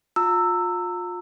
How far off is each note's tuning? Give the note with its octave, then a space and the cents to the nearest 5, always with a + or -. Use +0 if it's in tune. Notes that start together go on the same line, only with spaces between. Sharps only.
F4 +30 A#5 -35 E6 +5